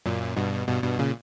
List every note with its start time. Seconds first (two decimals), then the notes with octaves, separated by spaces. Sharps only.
0.06 F#2 A#2
0.36 G2 B2
0.68 G2 B2
0.83 G2 B2
0.99 A#2 C#3